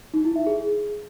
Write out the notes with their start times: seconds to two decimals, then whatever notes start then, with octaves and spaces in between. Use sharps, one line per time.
0.14 D#4
0.25 E4
0.36 E5
0.47 G#4